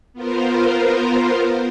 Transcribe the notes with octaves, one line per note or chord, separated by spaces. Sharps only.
B3 F4 A#4 C5